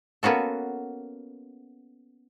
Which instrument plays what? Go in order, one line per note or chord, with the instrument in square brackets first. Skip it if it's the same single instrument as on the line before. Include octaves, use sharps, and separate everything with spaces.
[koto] A#3 B3 C#4 F#4 A4